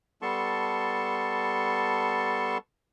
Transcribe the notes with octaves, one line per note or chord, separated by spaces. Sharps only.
G3 B3 A4 A5 C6 C#6